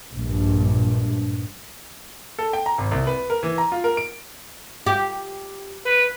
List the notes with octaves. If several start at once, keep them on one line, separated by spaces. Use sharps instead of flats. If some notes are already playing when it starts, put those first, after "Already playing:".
A#1 G2
A4
G5
A#5
G#1
C2
B4
A#4
E3
A#5
F4
A#4
D7
G4
B4